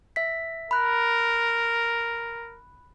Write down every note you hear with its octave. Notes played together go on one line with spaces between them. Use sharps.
E5 B6
A#4 B5 F#6